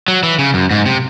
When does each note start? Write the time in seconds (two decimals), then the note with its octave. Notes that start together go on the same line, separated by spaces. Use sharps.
0.08 F#3
0.23 E3
0.39 C#3
0.54 F#2
0.71 G#2
0.86 C3